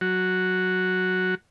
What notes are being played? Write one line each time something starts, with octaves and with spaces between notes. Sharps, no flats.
F#3 F#4